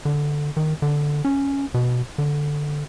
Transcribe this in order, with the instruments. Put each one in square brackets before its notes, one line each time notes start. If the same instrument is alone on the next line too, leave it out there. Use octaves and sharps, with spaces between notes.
[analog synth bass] D3
D#3
D3
C#4
B2
D3